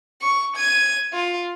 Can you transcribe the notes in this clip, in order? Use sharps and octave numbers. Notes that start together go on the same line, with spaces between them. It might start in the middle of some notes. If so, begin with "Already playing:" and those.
C#6
G#6 D#7
F4